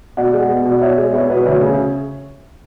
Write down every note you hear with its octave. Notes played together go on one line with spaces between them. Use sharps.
B2 D5 F#5
G#3
B3
B2
D5
B2 C#5 E5
G#3 D5
B3 C#5 E5
B2 B4 D5
D2 C#5 E5
C#3